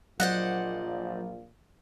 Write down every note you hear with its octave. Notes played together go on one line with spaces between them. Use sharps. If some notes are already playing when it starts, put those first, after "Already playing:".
A#1 A#2 F#3 F4 C5 D5 D#5 F#5